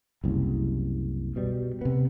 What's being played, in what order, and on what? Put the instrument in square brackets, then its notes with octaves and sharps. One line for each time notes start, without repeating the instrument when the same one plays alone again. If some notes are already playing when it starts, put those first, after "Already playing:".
[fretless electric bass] F#1 C2
B2 G3
C3 B3